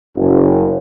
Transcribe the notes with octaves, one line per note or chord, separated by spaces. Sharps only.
F#1